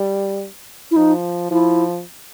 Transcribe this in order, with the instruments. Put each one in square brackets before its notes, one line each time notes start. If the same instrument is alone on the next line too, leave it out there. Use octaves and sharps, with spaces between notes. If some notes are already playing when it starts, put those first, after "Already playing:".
Already playing: [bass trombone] G3
[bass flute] E4
[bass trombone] F3 [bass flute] D#4
[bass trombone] F3 [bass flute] E4